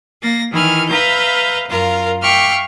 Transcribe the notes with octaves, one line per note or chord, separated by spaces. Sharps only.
A#3 A6 A#6
D#3 E3 E4 G#5 F6
B4 E5 F5 A#5 G6
F#2 F4 A#4
E5 F5 G5 C#6 D6 F6